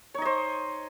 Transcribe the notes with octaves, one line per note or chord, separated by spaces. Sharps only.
D#4 C5 C#5 D#5